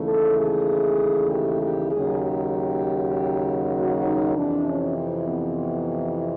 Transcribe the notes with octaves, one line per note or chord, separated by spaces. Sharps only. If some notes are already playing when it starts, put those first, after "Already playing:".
Already playing: D#2 C#3 E3 A3
A4
G#4
G4
G4
D#2 C#3 F#3 G#4
G4
F#4
D#4
F2 C3 E3 D4
C#4
C4
B3